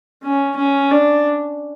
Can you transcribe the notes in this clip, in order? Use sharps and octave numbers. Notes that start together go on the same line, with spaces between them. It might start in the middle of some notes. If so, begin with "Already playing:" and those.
C#4
C#4
D4